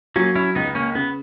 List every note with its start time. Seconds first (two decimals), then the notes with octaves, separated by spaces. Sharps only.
0.16 F#3 A#3 C#4
0.35 C#4 E4
0.55 C#2 B3 D#4
0.75 A#3 C#4
0.95 C#3 B3